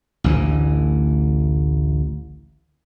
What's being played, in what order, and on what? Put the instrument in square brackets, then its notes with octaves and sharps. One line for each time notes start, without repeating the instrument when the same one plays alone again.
[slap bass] A1 D2 E3